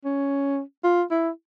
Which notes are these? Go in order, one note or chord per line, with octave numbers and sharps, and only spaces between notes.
C#4
F4
E4